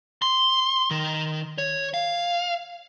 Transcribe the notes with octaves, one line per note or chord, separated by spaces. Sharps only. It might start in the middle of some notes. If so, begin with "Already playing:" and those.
C6
D#3
C#5
F5